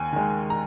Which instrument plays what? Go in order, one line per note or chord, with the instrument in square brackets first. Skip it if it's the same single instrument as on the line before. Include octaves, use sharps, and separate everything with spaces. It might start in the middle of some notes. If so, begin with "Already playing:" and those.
Already playing: [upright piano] D#2 G#5
D#3 G#3
A#5